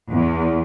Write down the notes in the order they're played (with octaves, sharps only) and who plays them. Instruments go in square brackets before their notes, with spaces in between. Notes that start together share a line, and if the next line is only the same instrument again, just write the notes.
[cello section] E2